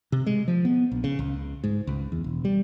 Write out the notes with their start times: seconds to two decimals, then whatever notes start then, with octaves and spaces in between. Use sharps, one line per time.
0.12 C3
0.26 G#3
0.48 F3
0.65 B3
0.92 A#1
1.04 C#3
1.19 C#2
1.64 G#2
1.87 C#2
2.12 E2
2.24 E1
2.45 G3